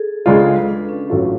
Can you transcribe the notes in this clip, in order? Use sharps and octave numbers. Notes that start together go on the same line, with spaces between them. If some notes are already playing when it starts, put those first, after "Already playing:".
Already playing: G#4 A4
C#2 C#3 G#3 D4 F4 A4
A4
B4
D4
C#4
A1 A2 F#3 A3 F4